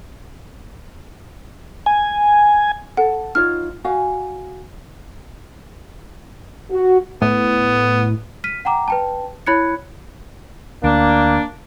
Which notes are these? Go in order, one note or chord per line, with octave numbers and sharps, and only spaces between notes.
G#5
A4 F#5
D#4 F4 C#5 F6
F#4 F5 G#5
F#4
A2 B3
F6 B6 D#7
F#5 G5 A#5 D6
B4 G5 A5
E4 C#5 B5 F#6 G#6 C#7
D2 A#3 D4